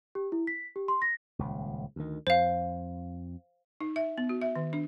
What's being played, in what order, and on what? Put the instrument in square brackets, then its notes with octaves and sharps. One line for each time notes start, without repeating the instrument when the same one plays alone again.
[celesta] G4
E4
B6
G4
C6
A#6
[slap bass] D#1 C#2
D2 D#3
[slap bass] F2 [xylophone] C5 F5
[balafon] D#4
E5
B3
F#4
E5
D#3
D4